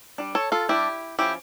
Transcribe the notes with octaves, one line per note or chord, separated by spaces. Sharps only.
G3 D4
A4 C#5
F4 A4
G3 D4 E4 G4
F3 C#4 E4 G4